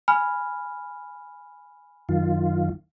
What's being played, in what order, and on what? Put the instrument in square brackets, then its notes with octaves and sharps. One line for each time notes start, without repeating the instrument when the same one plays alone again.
[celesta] G#5 B5 F6
[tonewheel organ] F#2 D#3 F4